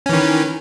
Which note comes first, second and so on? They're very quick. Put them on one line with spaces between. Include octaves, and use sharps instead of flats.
C#4 E3 D#3